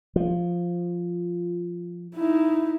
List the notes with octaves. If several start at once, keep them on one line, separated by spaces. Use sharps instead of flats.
F3
D#4 E4